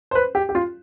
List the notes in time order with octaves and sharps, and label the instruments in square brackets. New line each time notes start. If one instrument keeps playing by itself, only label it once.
[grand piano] C5
B4
G4
G4
F4